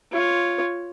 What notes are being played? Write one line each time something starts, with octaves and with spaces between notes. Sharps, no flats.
F4 C#5